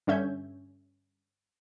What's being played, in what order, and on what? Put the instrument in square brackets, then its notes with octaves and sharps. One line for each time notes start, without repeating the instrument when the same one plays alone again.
[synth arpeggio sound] G2 D3 C#4 E5 G6 G#6